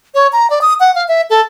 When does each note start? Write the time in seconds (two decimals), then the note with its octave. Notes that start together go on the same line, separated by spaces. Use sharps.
0.14 C#5
0.32 A#5
0.50 D5
0.61 D#6
0.80 F#5
0.95 F5
1.08 E5
1.30 A4